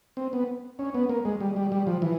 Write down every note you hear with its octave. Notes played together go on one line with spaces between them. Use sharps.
C4
B3
C#4
B3
A#3
G#3
G3
G3
G3
F3
E3